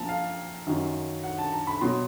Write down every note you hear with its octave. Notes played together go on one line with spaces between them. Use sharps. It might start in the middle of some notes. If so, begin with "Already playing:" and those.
Already playing: A#2 F3 A5 A#5
F5
F#2 D#3 F#3
F#5
A5
A#5
B5
B2 F#3 C6